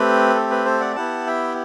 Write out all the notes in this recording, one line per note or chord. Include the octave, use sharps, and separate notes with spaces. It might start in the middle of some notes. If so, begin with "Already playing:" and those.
Already playing: A3 C4 G4 B4
A4
B4
A4 C5
D5 F#5
B3 E4 G4 F#5 A5
E5 G5